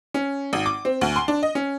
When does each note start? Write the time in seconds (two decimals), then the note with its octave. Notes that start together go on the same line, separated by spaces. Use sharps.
0.14 C#4
0.53 G#1
0.66 D6
0.85 C4
1.01 D2
1.16 C6
1.28 D4
1.43 D#5
1.55 C#4